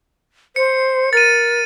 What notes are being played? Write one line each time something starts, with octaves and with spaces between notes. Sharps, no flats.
C5 C#7
A#4 A6 D#7